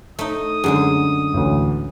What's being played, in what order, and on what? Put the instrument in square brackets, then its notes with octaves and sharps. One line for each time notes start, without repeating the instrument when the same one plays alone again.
[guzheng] A3 D#4 [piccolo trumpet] D#6
[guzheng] F#2 D3 G#3 [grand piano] G#4
[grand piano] A1 D2